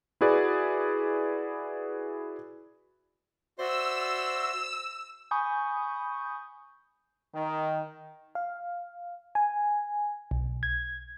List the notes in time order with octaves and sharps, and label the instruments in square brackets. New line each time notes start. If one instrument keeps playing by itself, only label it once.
[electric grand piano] E4 F#4 G#4 B4 D5
[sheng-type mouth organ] F#4 D5 E5 [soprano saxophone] C5 [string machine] E6
[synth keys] G#5 B5 C#6 D#6 G6
[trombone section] D#3
[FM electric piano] F5
G#5
B1
G#6